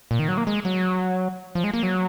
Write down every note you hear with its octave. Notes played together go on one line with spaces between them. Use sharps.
A#2
D#3
F#3
A#3
G#3
F#3
F3
G#3
A#3
F#3